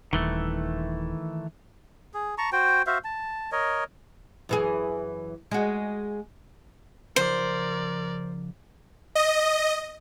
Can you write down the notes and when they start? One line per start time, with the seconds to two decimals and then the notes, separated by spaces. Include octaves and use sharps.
0.13 D#1 D#3 E3 A3
2.14 G#4
2.38 A5 A#5 C#6
2.52 F#4 C5 G5
2.87 F#4 C5 E5 F5
3.04 A5
3.52 A#4 C#5 D#5
4.49 F#2 E3 G#4
5.51 G#3 F#4
7.16 C#3 F3 A#4 C5 D5
9.15 D#5